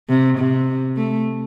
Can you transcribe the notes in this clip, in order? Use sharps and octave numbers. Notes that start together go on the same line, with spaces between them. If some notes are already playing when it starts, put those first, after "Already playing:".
C3
C3
A3